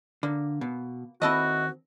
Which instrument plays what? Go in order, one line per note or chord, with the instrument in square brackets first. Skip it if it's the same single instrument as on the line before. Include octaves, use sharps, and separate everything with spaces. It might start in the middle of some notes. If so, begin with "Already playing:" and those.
[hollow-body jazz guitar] D3 [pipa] A#3
[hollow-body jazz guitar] B2
[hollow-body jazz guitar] D#2 C4 [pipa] E4 A4 D#5 [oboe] F#4